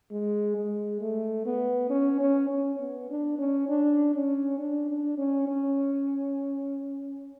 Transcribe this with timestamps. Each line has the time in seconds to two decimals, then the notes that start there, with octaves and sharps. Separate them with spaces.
0.11 G#3
0.56 G#3
1.01 A3
1.46 B3
1.90 C#4
2.21 C#4
2.50 C#4
2.80 B3
3.10 D4
3.39 C#4
3.69 D4
4.14 C#4
4.59 D4
4.89 D4
5.18 C#4
5.48 C#4